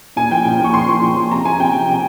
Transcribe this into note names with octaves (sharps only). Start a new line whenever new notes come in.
A#2 G#5
F3 G5
A#2
F3 C#6
A#2 C6
F3
A#2
F3
C3 A#5
F3 G#5
C3 G5
F3
C3 G5